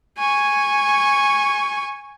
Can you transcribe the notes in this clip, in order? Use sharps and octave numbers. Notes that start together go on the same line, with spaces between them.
G#5 C#6